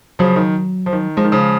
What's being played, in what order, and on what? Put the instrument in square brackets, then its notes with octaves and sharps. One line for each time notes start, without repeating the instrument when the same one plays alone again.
[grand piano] C#3 F3 [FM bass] F#3
[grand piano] D#3
F3
D#3
[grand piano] F3 [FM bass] G#3
[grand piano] D#3
C#3 F3